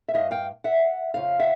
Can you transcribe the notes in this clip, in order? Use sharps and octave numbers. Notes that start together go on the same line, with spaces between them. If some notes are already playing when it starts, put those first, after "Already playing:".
E5
G2 E3 D#5 F5
F5 G5
E5 F#5
F2 C#3 F3 F5
E5 F#5